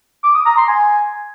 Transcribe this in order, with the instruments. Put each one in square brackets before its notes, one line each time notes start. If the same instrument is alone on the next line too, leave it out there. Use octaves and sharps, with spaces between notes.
[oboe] D6
D#6
A#5
C6
G#5